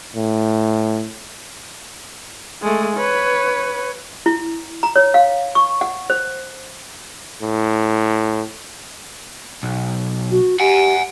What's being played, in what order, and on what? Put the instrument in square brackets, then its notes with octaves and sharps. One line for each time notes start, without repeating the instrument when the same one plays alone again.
[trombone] A2
[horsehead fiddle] G#3 A3
B4 C#5
[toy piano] E4
A#5
C#5
F5
C#6
F#5
C5
[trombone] A2
[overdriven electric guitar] B1
[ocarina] F#4
[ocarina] G4 [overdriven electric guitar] F#5 G#5